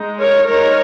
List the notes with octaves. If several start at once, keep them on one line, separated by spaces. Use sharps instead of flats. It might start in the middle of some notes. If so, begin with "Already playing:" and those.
Already playing: G#3 D#4
A#4 C#5
G#3 D#4 A#4 C#5